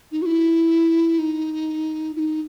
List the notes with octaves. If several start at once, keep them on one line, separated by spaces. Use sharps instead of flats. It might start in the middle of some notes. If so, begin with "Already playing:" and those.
D#4
F#4
E4
D#4
E4
D#4